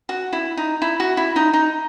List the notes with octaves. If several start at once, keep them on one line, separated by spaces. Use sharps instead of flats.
F#4
E4
D#4
E4
F#4
E4
D#4
D#4